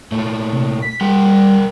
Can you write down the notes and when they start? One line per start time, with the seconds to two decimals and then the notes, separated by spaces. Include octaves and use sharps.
0.12 A#2 A3
0.52 C3
0.82 B6
1.01 G3 A#4 F#5 G5